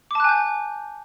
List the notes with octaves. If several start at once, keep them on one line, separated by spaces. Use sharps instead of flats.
G#5 A5 D6 F#6 G6